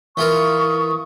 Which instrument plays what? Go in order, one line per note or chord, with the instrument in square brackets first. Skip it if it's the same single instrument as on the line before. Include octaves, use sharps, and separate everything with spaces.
[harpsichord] E3 F4 A#4 [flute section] C#6 D#6